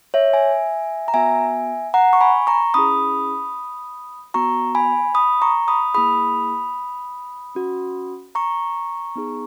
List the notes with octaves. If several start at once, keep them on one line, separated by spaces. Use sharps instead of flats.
C#5 E5
E5 G#5
A#5
B3 F#4 E5 G#5
F#5 A#5
C#6
G#5 B5
A#5 C#6
C#4 E4 G#4 B5 D#6
B3 F#4 A#5 C#6
G#5 B5
B5 D#6
A#5 C#6
B5 D#6
A#3 E4 G#4 B5 D#6
C#4 F#4
A#5 C#6
B3 D#4 G#4